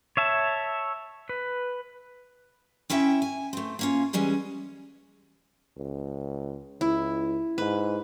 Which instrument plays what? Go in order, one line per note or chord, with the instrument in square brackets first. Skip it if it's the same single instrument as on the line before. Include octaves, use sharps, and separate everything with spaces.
[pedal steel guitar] C#5 E5 A5
B4
[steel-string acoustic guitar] C4 C#4 E4 E5 G5
G#5
A3 C4
A#3 C#4 F4
E3 G3 G#3 C#4
[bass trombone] C#2
[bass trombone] C#2 [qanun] E4
[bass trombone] G#2 [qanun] B4